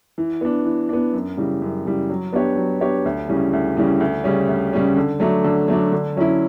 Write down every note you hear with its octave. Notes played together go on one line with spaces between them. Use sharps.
E3
B3 D4
E3
B3 D4
F#2
C#3 E3 G3
F#2
C#3 E3 G3
F#3
B3 D4 G4 C#5
F#3
B3 D4 G4 C#5
D2
C#3 E3 G3 C#4
D2
C#3 E3 G3 C#4
D2
C#3 G3 C#4
D2
C#3 G3 C#4
D3
F#3 A3 D4
D3
F#3 A3 D4
D3
F#3 C#4 E4